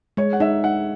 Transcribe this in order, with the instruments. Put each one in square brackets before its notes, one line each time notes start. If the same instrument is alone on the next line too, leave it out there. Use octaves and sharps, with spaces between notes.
[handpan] G#3 [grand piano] C#5
[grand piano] F#5
[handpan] D#4 [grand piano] E5
[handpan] D#4 [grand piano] F#5